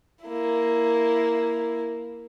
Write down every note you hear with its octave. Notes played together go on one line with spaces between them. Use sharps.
A#3 E4